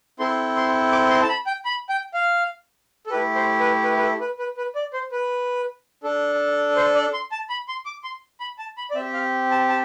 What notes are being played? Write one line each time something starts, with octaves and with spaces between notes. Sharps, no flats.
C4 E4 A4 C6
C6
D6
C6
A5
B5
G5
B5
G5
F5
A4
A3 E4 G4 B4
C5
B4
B4
B4
A4
B4
B4
B4
D5
C5
B4
D4 A4
C5
D5
C6
A5
B5
C6
D6
C6
B5
A5
B5
D5
C4 G4 E5
F5
A5
A5